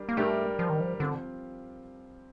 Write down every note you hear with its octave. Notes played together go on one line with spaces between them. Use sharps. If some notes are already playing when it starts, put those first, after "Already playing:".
Already playing: G3 D4 G4 A#4
A#3
G3 A3 D4 G4 A#4
F3
D#3
F3
D3 F3 C4 F4